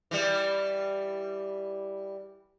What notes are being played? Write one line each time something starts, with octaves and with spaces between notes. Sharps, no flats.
E3 G3